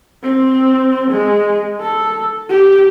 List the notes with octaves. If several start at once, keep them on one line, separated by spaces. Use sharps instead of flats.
C4
G#3
A4
G4